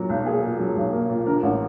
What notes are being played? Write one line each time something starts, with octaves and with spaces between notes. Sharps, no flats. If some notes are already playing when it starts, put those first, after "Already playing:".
Already playing: A#2 F#3 A#3
B1
A#3 G#4
A#2
F#3
B1
A#3
A#2
D3 A#4
A1